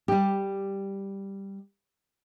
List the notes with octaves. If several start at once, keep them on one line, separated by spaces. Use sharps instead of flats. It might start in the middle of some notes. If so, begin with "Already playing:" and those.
G3 G4